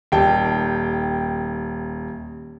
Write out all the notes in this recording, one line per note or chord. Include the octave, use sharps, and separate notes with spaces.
D#1 G5 A5